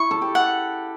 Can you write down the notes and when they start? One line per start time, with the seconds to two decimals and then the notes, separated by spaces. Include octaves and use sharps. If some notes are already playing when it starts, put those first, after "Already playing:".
Already playing: E4 C#6
0.11 A4
0.22 G4
0.35 F#5